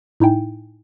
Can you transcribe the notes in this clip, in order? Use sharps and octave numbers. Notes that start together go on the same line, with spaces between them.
A2 D#4 E4 G5 G#5